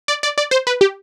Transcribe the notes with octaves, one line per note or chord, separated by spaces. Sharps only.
D5
D5
D5
C5
B4
G4